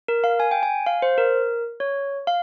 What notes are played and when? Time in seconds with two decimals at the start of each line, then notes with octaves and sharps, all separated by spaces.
0.08 A#4
0.24 F5
0.40 G#5
0.51 G5
0.63 G#5
0.86 F5
1.02 C5
1.18 A#4
1.80 C#5
2.27 F5